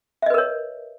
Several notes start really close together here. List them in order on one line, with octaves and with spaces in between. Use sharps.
E5 D#5 B4 A#4 C#5